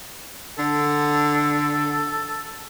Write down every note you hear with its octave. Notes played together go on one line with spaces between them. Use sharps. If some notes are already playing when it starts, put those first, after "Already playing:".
D3 A4